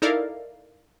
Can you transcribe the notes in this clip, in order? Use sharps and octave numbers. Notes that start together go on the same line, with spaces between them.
D#4 E4 A4 A#4 D5 F5